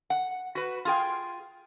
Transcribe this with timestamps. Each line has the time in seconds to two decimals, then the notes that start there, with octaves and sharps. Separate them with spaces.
0.10 F#5
0.55 F#4 B4
0.85 F4 G#4 G5